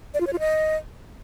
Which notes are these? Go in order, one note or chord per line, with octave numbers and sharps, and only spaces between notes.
D5
F4
C#5
F4
D#5